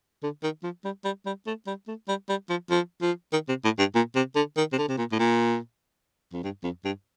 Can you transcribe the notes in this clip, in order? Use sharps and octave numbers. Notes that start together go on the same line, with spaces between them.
D3
D#3
F3
G3
G3
G3
A3
G3
A3
G3
G3
F3
F3
F3
D#3
C3
A2
G2
A#2
C3
D3
D#3
C3
D3
C3
A#2
A2
A#2
F2
G2
F2
G2